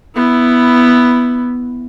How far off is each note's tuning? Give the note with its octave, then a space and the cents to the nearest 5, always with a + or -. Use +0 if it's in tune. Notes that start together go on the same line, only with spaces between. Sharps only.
B3 +0 E4 +0